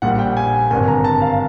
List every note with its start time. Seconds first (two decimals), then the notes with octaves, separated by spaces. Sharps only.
0.02 A#1 A#2 G3 F#5
0.19 G5
0.37 G#5
0.70 G#1 G2 D3 G#5
0.88 A#5
1.04 A5
1.22 F5